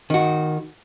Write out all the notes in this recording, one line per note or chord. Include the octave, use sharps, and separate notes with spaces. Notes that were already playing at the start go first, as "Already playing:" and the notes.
D#3 F#4